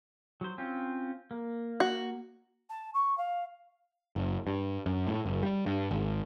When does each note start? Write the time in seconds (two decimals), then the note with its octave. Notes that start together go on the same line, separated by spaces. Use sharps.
0.41 F#3 C5
0.58 C4 C#4 F4
1.31 A#3
1.80 F#4
2.69 A5
2.94 C#6
3.17 F5
4.16 F#1
4.47 G2
4.86 F#2
5.07 A2
5.26 F#1
5.43 G3
5.66 G2
5.91 G#1